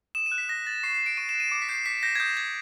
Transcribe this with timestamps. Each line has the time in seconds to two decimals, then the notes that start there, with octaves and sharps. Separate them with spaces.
0.15 D#6 E7
0.26 D#7
0.32 F#6
0.38 B6
0.49 D#6 A#6
0.66 F#6 A6
0.83 C#6 C7
0.94 C7
1.00 F#6
1.06 D7
1.17 C#6 D#7
1.29 E7
1.35 F#6
1.40 D#7
1.52 D6 C#7
1.62 B6
1.69 G6 C7
1.86 D6 B6
2.03 G6 A#6
2.15 G#6
2.20 D#6 G6
2.37 G6 G#6